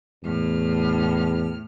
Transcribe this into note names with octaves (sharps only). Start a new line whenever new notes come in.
E2 A2 F6